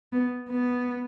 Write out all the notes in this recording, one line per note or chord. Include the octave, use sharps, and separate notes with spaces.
B3
B3